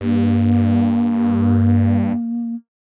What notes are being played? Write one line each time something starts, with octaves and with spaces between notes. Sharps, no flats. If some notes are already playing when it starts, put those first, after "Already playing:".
G2 A#3